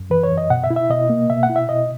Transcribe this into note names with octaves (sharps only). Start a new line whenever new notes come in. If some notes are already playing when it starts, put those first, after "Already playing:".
Already playing: F#2
E3 B4
C#5
F#2
D#5
B2 F#5
E5
E4
E5
B2 D#5
A#3
B2 E5
F#5
E4
E5
B2 D#5